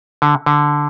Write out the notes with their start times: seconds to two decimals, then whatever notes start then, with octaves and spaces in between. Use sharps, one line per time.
0.22 D3
0.46 D3